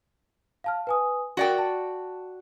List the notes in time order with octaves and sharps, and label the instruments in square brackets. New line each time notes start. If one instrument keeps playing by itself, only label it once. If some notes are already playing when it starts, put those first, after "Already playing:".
[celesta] F5 A5 F6
B4 G#5 D#6
[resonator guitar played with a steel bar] F#4 D5 G5 [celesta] A#4 F#5
[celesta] A5